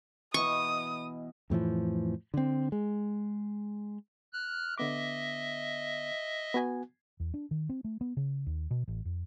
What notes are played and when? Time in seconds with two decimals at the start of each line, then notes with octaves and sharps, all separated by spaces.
0.34 B2 E3 D#5 C#6 D#6
1.50 F2 A2 E3 F3
2.34 D3 C4
2.72 G#3
4.33 F6 F#6
4.78 D3 B3 D#5 E5 D6
6.54 B3 F#4 G#5
7.20 E2
7.34 D4
7.51 D#3
7.69 C4
7.84 A3
8.01 B3
8.17 C#3
8.46 D#2
8.71 B2
8.88 A1
9.05 F2